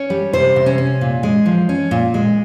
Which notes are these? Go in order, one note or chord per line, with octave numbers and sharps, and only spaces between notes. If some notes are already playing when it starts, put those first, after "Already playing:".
Already playing: C#4 C#5
G3
C3 C5
C3
C#4
C#4
A#2
G#3
F3
C#4
A#2
G#3